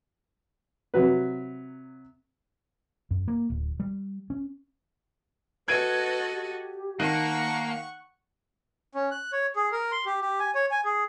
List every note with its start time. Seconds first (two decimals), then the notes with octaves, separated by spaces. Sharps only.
0.94 C3 F#3 B4
3.11 F#2
3.28 A#3
3.50 D1
3.80 G3
4.30 C#4
5.68 F#4 A4 B4 D#5 G#6 D7 D#7
6.34 G4
7.00 D#3 A#3 F#5 A5 C#6 F#6 D#7
8.95 C#4
9.11 F#6
9.32 C#5
9.56 G#4
9.72 A#4
9.92 C6
10.06 G4
10.22 G4
10.40 G#5
10.55 C#5
10.71 G#5
10.85 G#4